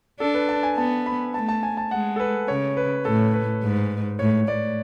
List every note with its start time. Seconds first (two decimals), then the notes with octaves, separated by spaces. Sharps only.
0.20 D4 A4
0.34 B4
0.49 A5
0.63 G#5
0.77 B3 A5
1.06 B5
1.34 A3 A5
1.49 A5
1.63 G#5
1.77 A5
1.91 G#3 F#5
2.16 A4
2.20 B4
2.48 C#3 C#5
2.77 B4
3.05 A2 A4
3.34 B4
3.63 G#2
4.19 A2 C#5
4.47 A2 D5